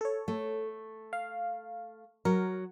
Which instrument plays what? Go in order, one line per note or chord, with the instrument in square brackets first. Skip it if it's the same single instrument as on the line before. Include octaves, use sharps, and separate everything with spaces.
[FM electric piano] A4 C#5
[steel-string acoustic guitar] A3
[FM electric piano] F5
[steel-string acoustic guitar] F#3 [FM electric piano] A#4